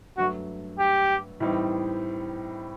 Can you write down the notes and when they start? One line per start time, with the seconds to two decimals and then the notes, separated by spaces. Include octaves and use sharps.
0.18 G2 F#3 A3 F#4
0.79 G4
1.40 A2 E3 G3 C4 D#4